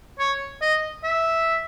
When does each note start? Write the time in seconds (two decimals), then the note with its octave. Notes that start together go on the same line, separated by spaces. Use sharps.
0.19 C#5
0.62 D#5
1.03 E5